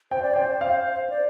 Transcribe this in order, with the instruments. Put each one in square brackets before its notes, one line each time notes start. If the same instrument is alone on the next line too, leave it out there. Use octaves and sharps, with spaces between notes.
[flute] C5 [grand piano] G5
[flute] D5
[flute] C5 [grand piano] G5
[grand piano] F5
[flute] D5